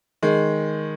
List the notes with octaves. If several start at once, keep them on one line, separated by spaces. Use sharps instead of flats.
D#3 G#3